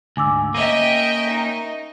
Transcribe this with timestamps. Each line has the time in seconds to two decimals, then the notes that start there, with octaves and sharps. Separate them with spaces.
0.17 D2 G#2 G#5 D6 E6
0.54 A#3 C#4 D#5 E5 G5 D#7
1.28 D#4